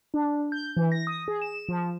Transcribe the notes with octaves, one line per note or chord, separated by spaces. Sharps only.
D4
G6
E3
A#6
D#6
G#4
E7
F3